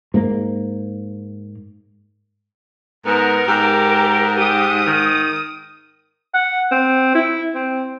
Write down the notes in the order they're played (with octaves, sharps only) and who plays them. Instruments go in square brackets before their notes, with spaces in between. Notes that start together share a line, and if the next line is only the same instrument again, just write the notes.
[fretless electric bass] G#2 A#3
[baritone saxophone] G#2 [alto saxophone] B3 [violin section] A#4
[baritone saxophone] G#2 [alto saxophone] G4
[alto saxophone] G4 [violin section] D#6
[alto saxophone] D#3
F#5
C4
E4
C4